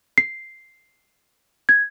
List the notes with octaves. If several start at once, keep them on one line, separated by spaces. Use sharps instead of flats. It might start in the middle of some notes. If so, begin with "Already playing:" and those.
C7
G#6